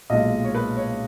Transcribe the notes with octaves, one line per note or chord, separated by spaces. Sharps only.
B1 A#2 G#3 D#5
C#5
B4
C#5